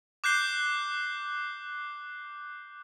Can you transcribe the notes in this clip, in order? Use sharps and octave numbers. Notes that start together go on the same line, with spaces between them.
D6 F#6 G6 C7 G7